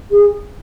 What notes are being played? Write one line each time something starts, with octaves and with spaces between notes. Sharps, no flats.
G#4